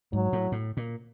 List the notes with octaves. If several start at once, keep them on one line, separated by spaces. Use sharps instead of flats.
G#2 F#3
A2
A2
A#2